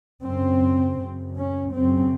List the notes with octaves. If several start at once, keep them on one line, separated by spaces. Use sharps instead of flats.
F#2 C#3 C4
F#2 C#3
C#4
F#2 C#3 C4